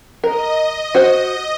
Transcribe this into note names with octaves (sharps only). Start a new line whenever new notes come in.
A#4 D#5
F#4 C5